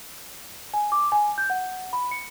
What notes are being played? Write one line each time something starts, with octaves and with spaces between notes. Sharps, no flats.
G#5
D6
G#5
G6
F#5
B5
C#7